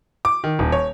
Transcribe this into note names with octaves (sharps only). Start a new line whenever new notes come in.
D6
D#3
D#1
C#5